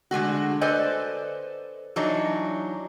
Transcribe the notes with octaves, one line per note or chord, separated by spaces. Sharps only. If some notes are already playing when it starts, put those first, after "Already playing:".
D3 G#3 A3 F#4
A4 B4 C5 D5 D#5 G#5
E3 F#3 D4 D#4 C#5